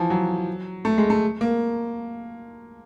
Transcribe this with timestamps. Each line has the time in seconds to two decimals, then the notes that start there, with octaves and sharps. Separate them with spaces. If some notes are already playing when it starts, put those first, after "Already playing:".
Already playing: E3 F3
0.10 F#3
0.85 A3
0.98 G#3
1.10 A3
1.41 A#3